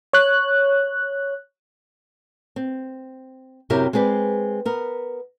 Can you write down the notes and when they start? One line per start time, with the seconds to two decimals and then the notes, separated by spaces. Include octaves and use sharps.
0.13 C#5 F#6
2.56 C4
3.70 F#2 C3 E4 G4 A#4
3.93 G#3 C4 G#4 B4 D5
4.65 B3 A#4